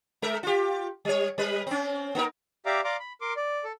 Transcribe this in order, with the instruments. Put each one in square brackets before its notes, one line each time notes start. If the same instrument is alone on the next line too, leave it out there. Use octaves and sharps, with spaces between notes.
[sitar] G#3 A#4 E5
F4 G4
G3 C#5
G3 B4
C4 C#4
A#3 D#4 A#4
[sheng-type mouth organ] G4 D5 E5 F5 A#5 D6
D5 F5 A#5 C6 D6
B5
A#4 C6 D6
D5
A4